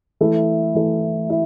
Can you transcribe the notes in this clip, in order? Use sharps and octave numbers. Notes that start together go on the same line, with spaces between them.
E3 A3 E4
E3 A3 E4
E4